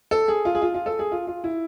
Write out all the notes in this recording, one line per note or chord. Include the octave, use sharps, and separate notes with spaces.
A4
G#4
F4
G#4
F4
F4
A4
G#4
F4
F4
E4